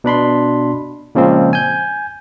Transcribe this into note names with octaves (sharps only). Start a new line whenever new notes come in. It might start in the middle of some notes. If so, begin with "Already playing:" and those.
B2 D4 B5 C6
A#2 C#3 F3 G#3 C4
G#5 G6